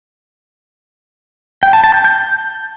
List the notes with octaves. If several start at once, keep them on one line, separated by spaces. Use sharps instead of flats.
G5
A5
A5
G6
G6